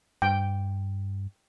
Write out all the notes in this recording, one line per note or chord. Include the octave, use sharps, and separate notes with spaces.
G2 G5